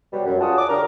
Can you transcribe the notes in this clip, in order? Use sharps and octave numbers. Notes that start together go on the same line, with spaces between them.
B2 F#3 G3
F#2
F4 G#4 C#5 F#5 A5 D#6
D6
D3 D4 G4 A#4